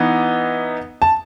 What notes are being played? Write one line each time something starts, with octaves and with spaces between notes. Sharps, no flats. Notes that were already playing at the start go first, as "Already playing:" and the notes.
Already playing: E3 B3 D#4
A5